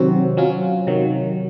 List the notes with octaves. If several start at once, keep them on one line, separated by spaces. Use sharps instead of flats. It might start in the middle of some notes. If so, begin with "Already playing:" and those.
Already playing: C3 D#3 F#3 C4 F#4
F#3 C#4 F4
C3 D#3 F#3